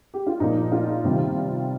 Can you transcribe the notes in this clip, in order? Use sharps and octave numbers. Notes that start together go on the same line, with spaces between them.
G4
F4
A#2 F3 A#3 D#4
F4
C3 D#3 G3